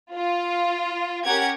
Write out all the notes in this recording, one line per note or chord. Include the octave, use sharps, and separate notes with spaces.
F4
C#4 G4 A#4 F#5 G#6